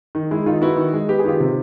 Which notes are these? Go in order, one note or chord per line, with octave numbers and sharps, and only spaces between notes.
D#3
G#3 E4
D#3 D#4 F4
B3 E4 F#4
D#3
G#3
B3 G4
G#4
D#3 F4 G4
C3